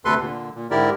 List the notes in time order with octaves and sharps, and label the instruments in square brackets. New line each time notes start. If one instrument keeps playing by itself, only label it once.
[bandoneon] D2 C3 A4 B4 C6
A#2 D3
A#2
G#2 D3 E4 G4 A#4 D5